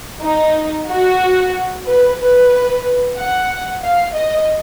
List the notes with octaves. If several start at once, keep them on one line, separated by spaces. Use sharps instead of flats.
D#4
F#4
B4
B4
F#5
F5
D#5